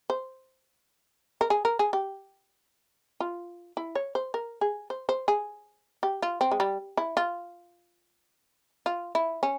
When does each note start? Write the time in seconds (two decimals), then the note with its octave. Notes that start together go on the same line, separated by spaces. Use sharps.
0.10 C5
1.41 A#4
1.50 G#4
1.65 A#4
1.79 G#4
1.93 G4
3.20 F4
3.77 E4
3.95 C#5
4.15 C5
4.34 A#4
4.61 G#4
4.90 C5
5.09 C5
5.28 G#4
6.03 G4
6.22 F4
6.41 C4
6.52 G#3
6.60 G3
6.97 E4
7.17 F4
8.86 F4
9.15 E4
9.43 C#4